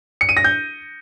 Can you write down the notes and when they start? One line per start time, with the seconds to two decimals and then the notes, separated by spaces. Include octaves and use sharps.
0.21 C#7
0.29 D#7
0.37 A#6
0.44 G6